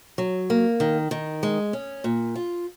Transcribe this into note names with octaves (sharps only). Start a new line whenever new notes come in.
F#3
A#3
D#3
D#3
G#3
C#4
A#2
F4